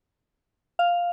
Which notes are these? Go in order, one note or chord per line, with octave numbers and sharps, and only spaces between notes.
F5